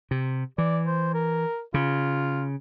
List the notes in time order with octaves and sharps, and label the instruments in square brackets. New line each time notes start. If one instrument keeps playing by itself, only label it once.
[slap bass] C3
[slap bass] E3 [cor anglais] D5
[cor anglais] C5
A#4
[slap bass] C#3 [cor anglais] F4